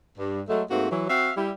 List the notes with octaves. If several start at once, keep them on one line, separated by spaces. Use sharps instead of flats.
G2
F#3 G#3 A3
G#2 A3 A#3 C4 F#4
E3 F#3
C4 F#4 E5 F5
G3 E4